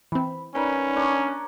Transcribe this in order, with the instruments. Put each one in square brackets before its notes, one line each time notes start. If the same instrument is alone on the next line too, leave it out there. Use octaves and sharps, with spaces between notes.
[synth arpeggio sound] E3 C4 [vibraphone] B5
[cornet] C#4 [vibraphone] D#4 D5 B5 [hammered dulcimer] A#4 B4
[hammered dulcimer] D4 A#4 C#5